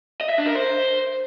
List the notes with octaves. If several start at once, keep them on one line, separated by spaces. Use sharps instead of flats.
D#5
E5
D4
A#4
C5